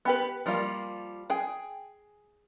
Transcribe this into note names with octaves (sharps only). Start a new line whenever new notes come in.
B3 G4 B4
F3 G3 A#3 F4
G#4 G5